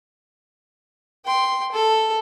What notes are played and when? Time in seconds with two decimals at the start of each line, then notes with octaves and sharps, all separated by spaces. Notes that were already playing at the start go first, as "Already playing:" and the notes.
1.25 G5 C6
1.72 A4